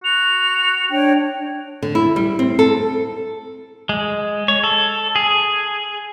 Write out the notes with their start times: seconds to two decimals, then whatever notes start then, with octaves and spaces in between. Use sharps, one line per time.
0.04 F#4 F7
0.91 D4 C#5 G5
1.82 D3
1.95 E4
2.16 G3
2.39 C4
2.59 A4
3.89 G#3
4.48 C#5
4.64 A4
5.16 G#4